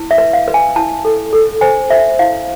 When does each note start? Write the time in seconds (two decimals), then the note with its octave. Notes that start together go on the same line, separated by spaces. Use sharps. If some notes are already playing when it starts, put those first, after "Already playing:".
Already playing: E4
0.11 E5
0.18 B4
0.33 F5
0.48 B4
0.54 G#5
0.76 E4 A5
1.05 A4
1.33 A4
1.61 C5 G#5
1.90 C5 E5
2.19 E4 F5